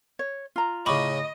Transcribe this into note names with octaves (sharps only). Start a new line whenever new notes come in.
C#5
F4 A#5
A2 C#3 D#5 B5 C#6 D6